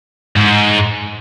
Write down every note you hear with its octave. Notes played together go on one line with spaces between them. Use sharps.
G#2